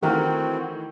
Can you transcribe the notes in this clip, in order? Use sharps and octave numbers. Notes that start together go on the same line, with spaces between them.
D#3 E3 A3 C4 F#4 G4 A#4 F#5